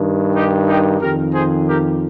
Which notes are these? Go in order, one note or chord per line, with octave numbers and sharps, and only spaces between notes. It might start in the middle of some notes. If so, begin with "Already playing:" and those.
Already playing: G2 D#3
D#4 G4
D#4 G4
F2 D#3 G4 A#4
G#4 C5
G4 A#4